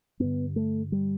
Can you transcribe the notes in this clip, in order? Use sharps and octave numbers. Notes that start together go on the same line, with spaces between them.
G2 D3 B3
A3
G3